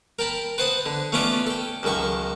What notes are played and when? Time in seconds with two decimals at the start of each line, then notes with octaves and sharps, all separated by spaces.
0.19 A#4 G5 A5 B5
0.58 B4 C5 F#5 A5 D#6
0.86 D3
1.12 A3 B3 C#4 E4 F4 D5
1.47 A4 G5
1.83 C#2 F#2 D#3 A4 C#6